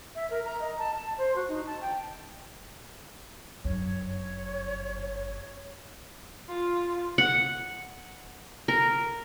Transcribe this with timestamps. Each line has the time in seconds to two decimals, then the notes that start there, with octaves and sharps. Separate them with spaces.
0.15 E5
0.30 A#4
0.45 A#5
0.60 D#5
0.79 A5
0.94 A5
1.18 C5
1.36 F#4
1.48 D#4
1.67 A5
1.81 G5
3.65 G1 F#2 C#5
6.49 F4
7.18 F#5
8.68 A#4